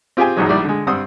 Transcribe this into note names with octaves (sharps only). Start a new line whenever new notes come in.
C4 F4 G4 G#4 G5 G#5
A#1 E2 G#2 B2 F#3 G#3
A#1 D#3 G3 E4 D5
D3 G#3
G2 G3 C4 F#5 D#6 E6